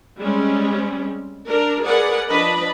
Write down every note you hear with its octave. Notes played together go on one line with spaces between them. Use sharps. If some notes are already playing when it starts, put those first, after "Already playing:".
G3 G#3 C4 C#4
D4 A#4
G#4 A#4 B4 D5 F#5
F3 D4 B4 D#5 B5